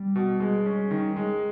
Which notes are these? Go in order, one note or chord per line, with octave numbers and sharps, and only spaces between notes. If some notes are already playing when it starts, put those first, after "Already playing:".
Already playing: G3
B2
G#3
C#4
D#3
G#3